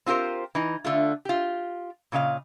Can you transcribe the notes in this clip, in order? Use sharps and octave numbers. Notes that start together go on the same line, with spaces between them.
C4 F4 G4 A#4 C5
E3 D#4
D3 A3 F4
F4 G4
A#2 C#3 D#5 F5